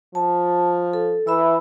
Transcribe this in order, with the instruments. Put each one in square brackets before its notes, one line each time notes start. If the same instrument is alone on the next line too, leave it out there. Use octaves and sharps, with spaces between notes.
[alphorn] F3 [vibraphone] A5
[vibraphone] A4
[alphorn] E3 [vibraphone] E5 B5 E6